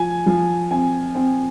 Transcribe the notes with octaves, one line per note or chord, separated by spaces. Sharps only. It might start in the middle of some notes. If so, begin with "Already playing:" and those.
Already playing: F3 G#5
F3
C4 G#5
C4